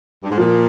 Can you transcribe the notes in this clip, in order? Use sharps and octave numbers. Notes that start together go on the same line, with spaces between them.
G2
G#2
A#2 F3